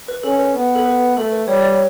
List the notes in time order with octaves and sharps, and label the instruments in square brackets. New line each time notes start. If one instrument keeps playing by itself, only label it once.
[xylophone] B4
[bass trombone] C#4 [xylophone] A4
[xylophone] B4
[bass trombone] B3
[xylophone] A4
B4
[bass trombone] A3 [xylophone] A4
[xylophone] B4
[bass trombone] G3 [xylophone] C#5
[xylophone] D5
C#5